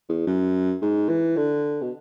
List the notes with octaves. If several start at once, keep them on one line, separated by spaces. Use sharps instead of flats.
E2
F#2
G#2
E3
D3
B2